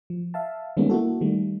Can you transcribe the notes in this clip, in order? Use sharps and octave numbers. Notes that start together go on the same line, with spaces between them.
F3
E5 F5 A5
D#3 G3 G#3 A#3 B3 C#4
A#3 E4 F#4 A4
D#3 G3 A3